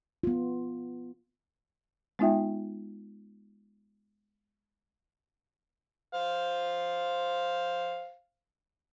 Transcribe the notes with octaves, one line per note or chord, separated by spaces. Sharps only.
B3 F4
G#3 B3 D#4 F4 E5 G5
C5 F5